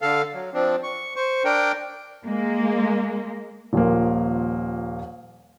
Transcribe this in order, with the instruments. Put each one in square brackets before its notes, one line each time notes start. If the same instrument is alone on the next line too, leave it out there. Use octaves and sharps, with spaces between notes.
[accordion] D3 A4 F5
F#3
F3 C4 D4
C#6
C5 C#6
D4 A#4 G5
[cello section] G#3 A#3
[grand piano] D#1 A#2 F3 A#3